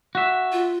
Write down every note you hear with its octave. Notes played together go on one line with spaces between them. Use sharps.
F#4 E5
F4